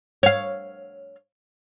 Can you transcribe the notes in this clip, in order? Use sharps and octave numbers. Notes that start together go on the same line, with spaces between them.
C#5 F5